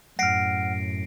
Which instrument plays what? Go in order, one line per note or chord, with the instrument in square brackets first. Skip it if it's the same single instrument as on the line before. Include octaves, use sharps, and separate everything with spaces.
[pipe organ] F#2 A2 [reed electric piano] F#5 F6 [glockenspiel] A#6 C7 D7